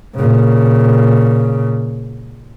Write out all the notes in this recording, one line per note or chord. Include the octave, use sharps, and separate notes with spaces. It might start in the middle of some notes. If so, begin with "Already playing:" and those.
A#2 C#3